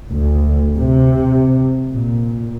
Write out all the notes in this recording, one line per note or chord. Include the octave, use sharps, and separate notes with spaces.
D2
C3
A#2